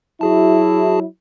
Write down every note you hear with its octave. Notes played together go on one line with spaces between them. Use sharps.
F#3 E4 F#4 G#4 A5